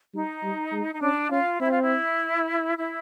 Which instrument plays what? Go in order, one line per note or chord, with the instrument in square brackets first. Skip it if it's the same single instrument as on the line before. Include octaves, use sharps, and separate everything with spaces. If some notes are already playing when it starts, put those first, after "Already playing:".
[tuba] G3 [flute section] D#4
[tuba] G3
G#3
[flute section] D#4
[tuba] C#4 [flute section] D4
[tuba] C#4 [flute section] F4
[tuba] C4 [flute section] E4
[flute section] F4
E4
E4